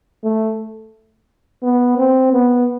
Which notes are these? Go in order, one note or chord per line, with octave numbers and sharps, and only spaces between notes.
A3
B3
C4
B3